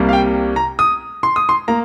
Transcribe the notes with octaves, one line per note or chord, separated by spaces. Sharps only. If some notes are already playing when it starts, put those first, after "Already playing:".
Already playing: C2 C3 G3 A#3
F5
G5
A#5
D#6
C6
D#6
C6
A#3 A#5